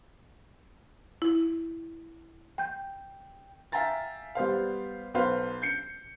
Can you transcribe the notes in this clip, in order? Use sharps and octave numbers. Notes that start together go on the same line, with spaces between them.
E4
G5 G6
E5 F5 G5 G#5 A#5 A6
G3 B3 C5 F5
B1 F#3 B4 C5 F5
G6 C7 C#7